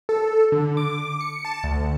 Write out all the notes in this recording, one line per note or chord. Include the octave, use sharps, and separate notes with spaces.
A4
D3
D6
C#7
A5
D2